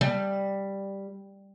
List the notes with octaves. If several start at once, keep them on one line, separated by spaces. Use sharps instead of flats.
G3